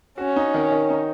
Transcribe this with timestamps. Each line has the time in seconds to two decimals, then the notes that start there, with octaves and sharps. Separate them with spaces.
0.18 C#4 F#4
0.36 D#4
0.54 D#3
0.72 D#3
0.90 D#4